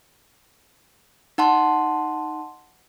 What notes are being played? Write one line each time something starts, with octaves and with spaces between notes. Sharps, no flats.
D#4 F#5 A5 C6